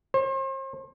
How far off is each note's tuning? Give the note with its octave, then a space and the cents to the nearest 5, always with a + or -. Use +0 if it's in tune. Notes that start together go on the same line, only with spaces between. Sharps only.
C5 +40